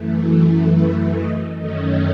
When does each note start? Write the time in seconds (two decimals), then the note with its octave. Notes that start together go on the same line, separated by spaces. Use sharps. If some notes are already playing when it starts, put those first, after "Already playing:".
Already playing: F#2 E3 A3
0.71 B4
1.15 D#5
1.58 F#2 D#3 A3 C#4 D#5